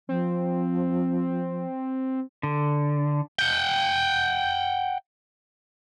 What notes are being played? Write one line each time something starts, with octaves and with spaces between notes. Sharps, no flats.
F3 C4
D3
F#5 G5